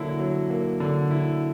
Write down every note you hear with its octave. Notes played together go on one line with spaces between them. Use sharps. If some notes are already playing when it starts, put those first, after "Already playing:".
Already playing: D3 F#3 A#3 E4
F#3
A#3
D3
E4